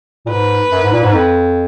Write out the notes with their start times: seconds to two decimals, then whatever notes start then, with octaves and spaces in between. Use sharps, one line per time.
0.26 A#2
0.30 G#2 B4
0.71 F#2
0.83 G#2
0.93 A#2
1.03 G#2
1.13 F2